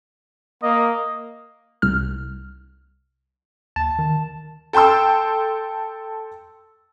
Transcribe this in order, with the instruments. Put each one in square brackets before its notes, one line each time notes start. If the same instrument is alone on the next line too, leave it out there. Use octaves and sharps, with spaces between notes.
[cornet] A#3 [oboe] D#5
[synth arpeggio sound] C2 F6
[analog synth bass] D#2 [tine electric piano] A5
[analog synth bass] D#3
[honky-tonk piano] A4 G5 A5 C6 E6